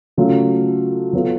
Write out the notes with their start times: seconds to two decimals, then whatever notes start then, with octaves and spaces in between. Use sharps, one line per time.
0.17 C#3 F#3 A3 F4
1.13 F#3 B3 F4 A4